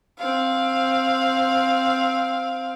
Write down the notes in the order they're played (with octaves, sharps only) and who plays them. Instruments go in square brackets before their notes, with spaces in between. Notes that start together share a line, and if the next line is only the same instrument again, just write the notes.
[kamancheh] C4 F5